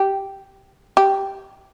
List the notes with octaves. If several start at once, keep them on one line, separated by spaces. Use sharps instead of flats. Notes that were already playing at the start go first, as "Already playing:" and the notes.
Already playing: G4
G4